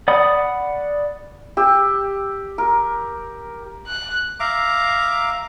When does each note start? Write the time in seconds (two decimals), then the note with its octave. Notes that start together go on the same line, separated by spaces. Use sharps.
0.08 D5 F#5 B5 D#6
1.57 G4 E6
2.58 A#4
3.87 F#6
4.40 E5 F5 A#5 D6